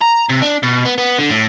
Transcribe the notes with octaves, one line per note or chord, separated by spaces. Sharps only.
A#5
C3
D4
B2
B3
B3
D3
A2